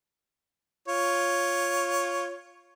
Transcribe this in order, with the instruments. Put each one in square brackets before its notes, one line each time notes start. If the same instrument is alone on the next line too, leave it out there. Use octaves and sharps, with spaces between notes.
[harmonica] F4 C#5